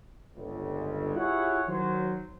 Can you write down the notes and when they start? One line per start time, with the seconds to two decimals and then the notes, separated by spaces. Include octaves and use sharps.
0.36 G1 C#2
1.16 E4 F4 G4 G#4 C#5 F#5
1.68 D#3 F#3 C5